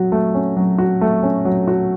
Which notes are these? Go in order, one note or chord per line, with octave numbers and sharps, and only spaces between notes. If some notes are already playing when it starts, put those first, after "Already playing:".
Already playing: F#3 F#4
A3
C#4
F#3
F#4
A3
C#4
F#3
F#4